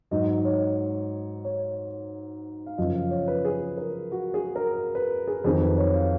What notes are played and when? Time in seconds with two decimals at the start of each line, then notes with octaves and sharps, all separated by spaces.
0.11 G#2 F#3 D#5
0.45 C#5
1.45 C#5
2.66 F5
2.78 F#2 C#3 F3 D#5
2.95 F5
3.11 C#5
3.28 B4
3.45 G#4
3.77 A#4
4.12 F#4
4.34 G#4
4.56 A#4
4.95 B4
5.27 G#4
5.44 F2 D#3 F#3 G#4
5.61 B4
5.78 C#5
5.94 F5